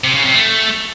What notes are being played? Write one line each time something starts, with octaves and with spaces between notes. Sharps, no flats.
C3
C#3
C3
A3